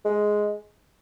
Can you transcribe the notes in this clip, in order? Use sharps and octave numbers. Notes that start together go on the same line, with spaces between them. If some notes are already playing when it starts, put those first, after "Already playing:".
G#3